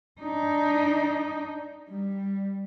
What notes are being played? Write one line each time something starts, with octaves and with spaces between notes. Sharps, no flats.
D4 D#4
G3